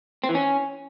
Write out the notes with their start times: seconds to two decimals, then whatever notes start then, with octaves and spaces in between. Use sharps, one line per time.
0.24 C4
0.29 E3
0.35 C#4